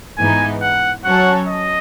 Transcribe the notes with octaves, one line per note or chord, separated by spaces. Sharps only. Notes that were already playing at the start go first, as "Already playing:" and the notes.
G#2 E3 B3 D#4 G#5
F#5
F#3 C#4 F#4 A4 C#5 F#5
D#5